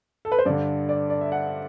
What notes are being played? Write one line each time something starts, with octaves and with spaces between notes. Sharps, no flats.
A4
B4
C5
G2 D3 D5
D5
D5
E5
F#5